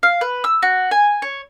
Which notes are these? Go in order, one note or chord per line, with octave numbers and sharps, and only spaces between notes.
F5
B4
E6
F#4
G#5
C#5